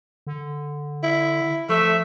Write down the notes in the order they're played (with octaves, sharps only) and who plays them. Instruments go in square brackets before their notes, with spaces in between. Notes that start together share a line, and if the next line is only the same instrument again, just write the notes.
[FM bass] D3
[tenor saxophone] E4
[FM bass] F3 [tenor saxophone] A3 [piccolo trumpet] E5